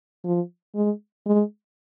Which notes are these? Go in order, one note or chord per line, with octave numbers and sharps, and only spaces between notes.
F3
G#3
G#3